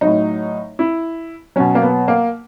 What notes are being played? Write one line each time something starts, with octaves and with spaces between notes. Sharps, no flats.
A2 F#3 D#4
E4
B2 F#3 C#4
A#3
B3
A#3